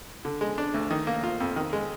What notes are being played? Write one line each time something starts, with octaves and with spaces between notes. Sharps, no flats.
D3
G#3
D4
D2
D#3
A#3
F4
F2
D#3
G#3